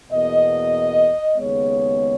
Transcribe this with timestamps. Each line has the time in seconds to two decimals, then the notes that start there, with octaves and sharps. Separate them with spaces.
0.12 E2 B2 A#3 D#5
1.35 D#2 C#3 G#3 B3 C#5